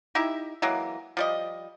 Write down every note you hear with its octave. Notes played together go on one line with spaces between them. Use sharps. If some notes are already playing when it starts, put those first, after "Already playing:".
D#4 E4 G4 E5
E3 F#3 G#3 A#3
F3 G3 D#5